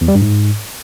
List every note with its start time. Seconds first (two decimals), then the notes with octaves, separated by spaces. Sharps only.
0.01 E2
0.08 G3
0.15 G2
0.22 G#2